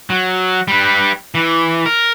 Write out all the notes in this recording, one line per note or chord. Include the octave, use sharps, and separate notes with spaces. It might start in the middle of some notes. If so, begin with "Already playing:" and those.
F#3
G3 B4
E3
A#4